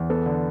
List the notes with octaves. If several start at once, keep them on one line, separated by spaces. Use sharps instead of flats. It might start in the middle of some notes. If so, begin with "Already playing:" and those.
Already playing: E2
B3 A4
D3